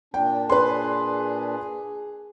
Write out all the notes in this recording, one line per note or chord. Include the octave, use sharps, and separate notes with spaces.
A#2 D4 G5
G#4 B4 C6